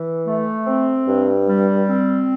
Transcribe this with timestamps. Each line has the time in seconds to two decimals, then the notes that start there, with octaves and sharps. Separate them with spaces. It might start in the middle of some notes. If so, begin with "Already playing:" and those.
Already playing: E3
0.26 A3
0.67 C4
1.06 G2
1.47 G3
1.87 C4